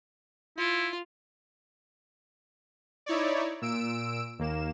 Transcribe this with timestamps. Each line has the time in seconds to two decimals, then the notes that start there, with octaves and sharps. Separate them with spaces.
0.58 E4 F4
3.06 D#4 E4 C#5 D5
3.62 A#2 E6 D7
4.39 D#2 A#3 E7